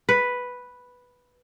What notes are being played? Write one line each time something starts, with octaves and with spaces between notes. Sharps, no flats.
B4